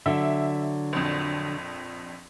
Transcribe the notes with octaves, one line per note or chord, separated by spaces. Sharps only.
D3 F#3 E5
A#1 F2